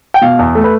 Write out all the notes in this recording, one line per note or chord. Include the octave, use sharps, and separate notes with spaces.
G5
B2 F5
E2
A3
B4